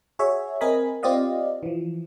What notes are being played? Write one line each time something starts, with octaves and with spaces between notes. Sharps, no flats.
F#4 G#4 C#5 E5
C4 A#4 D#5 G#5 B5
C4 F4 G4 D5 D#5 F5
E3 F3